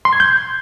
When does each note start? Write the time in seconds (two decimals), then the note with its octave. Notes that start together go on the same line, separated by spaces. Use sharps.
0.05 C6
0.13 G#6
0.20 G6